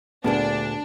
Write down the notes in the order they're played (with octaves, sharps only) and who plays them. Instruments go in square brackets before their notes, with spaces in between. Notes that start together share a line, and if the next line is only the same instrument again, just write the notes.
[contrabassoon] D2 [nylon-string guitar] A#2 G#4 D5 [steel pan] B3 A5 [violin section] D4